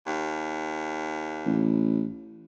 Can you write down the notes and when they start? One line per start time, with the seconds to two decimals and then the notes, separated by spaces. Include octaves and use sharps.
0.06 D#2
1.46 A1